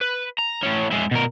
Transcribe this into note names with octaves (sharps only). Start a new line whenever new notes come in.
B4
A#5
A2 C#4
G#3 E4
B2 A#4